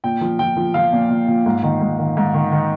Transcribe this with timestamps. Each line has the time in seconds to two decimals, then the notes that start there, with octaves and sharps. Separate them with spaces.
0.04 A#2 G5
0.21 F3
0.39 F3 G5
0.57 F3
0.74 F3 F5
0.93 A#2
1.10 A#2
1.28 A#2
1.46 G#2
1.63 D#3
1.81 G#2
1.98 D#3
2.17 G#2
2.34 D#3
2.52 D#3